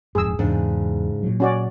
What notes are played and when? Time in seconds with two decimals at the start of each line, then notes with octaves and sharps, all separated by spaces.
0.15 D#1 F2 G#2 G#4 E6
0.39 E2 G#2 C#3 D4
1.23 A#2 F#3
1.40 C#4 F#4 D5